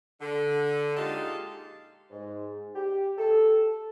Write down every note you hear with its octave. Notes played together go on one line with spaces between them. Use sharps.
D3
A#2 G#3 D#4 G4 F5 A5
G#2
G4
A4